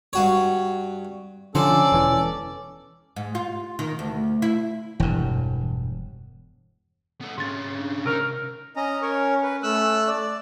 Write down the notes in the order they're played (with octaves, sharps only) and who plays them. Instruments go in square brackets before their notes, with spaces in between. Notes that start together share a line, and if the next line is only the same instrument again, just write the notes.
[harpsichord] G2 F#4 C#5
[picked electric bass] D3 F3 [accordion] C#4 A4 [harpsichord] C5 [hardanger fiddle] D5
[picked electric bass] E1 E3
[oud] G#2
F4
D#3
D2
E4
[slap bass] E1 G2 [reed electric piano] E3
[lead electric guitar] B3 A4
[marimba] G#2 A6 [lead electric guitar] C3 C#4
[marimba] D4
[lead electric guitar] C#2 D#4 [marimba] C3 C#4 [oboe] A#4
[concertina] C#4 [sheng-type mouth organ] D#5 A#5
[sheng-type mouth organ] A#4 C#5
B4
A3 E6 F#6
[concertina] D5